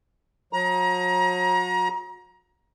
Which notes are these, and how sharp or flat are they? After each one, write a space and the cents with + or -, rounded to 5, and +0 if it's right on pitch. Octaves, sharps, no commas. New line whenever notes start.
F#3 -40 A#5 +30